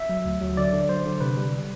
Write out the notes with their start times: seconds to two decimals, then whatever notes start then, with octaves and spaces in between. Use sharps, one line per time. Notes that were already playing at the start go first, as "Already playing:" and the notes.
Already playing: E5
0.09 F#3
0.25 D2
0.41 F#3
0.57 D3 D5
0.73 D3
0.89 F#3 C5
1.05 D3
1.21 C3 B4
1.37 G3